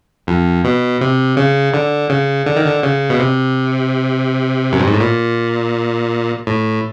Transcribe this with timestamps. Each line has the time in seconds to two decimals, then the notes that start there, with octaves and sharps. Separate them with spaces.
0.27 F2
0.64 B2
1.01 C3
1.37 C#3
1.74 D3
2.09 C#3
2.47 D3
2.56 D#3
2.67 D3
2.83 C#3
3.10 B2
3.19 C3
4.72 F#2
4.80 G2
4.87 G#2
4.94 A2
5.01 A#2
6.47 A2